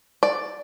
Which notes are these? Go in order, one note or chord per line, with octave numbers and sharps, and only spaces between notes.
D5